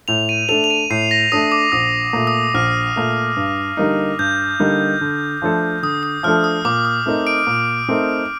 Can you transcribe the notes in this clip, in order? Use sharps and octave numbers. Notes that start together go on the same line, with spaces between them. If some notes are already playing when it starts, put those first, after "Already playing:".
A2 F7
D#7
A3 D4 A4 F7
F7
D#7
A2 C7
A#6
A3 D4 A4 D#6
D6
A#1 D#6
A#2 A3
D#6
A#1 F6
A#2 A3
G2
D3 G3 A#3 D#4
G2 G6
D3 G3 A#3 D#4
D3
F3 A3 D4 A4
D3 D#6
D#6
F3 A3 D4 A4 F6
D#6
A#2 D6
D#6
A3 C4 D#4 A#4
D7
A#2
A3 C4 D#4 A#4